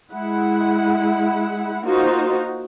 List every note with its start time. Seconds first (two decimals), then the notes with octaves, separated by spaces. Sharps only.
0.13 G#3 E4 F#5
1.85 A#3 D#4 F4 F#4 C5